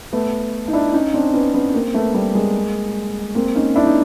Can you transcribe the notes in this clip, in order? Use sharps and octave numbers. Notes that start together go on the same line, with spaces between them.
A3 B3
D#4
D4 E4
C#4 D#4
C4 D4
B3 C#4
B3 C#4
A#3 C4
A3 B3
G3 A3
G#3 A#3
A#3 C4
C#4 D#4
D4 E4
C#4 D#4